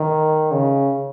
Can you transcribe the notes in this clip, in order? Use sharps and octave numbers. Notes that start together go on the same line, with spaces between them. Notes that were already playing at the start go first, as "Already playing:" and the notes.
Already playing: D#3
C#3